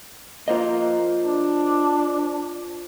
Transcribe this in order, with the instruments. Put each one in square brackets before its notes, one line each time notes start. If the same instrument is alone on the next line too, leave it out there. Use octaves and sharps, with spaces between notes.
[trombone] A#3 [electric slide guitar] F4 C5 D#5
[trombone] D4